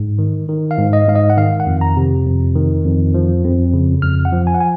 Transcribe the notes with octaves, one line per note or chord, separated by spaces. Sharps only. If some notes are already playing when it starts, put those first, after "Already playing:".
Already playing: G#2
D#3
D#3
F5
G#2
D#5
G#2 F5
D#5
F#5
D#3 F5
F#5
F2
A#5
C3
F2
D#3
F2
F3
F2
C#3
F2 F6
F#5
F3
G#5
F#5
G#5